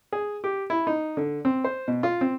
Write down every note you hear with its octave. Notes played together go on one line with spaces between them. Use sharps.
G#4
G4
E4
D#4
D3
C4
C5
B2
F4
C4